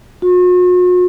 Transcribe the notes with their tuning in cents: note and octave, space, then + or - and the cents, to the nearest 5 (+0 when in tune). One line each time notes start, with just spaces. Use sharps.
F#4 -45